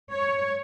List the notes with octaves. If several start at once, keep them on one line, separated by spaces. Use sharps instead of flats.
C#5